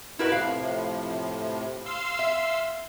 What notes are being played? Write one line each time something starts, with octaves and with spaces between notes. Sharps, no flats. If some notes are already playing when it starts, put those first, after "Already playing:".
G2 D#4 E4 F#4 A#4 B4
A2 C3 F3 F5
F5 C6 E6
E5